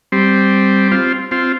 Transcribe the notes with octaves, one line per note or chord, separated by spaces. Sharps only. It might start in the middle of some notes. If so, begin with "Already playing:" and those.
G3 C4
C4 F4
C4 F4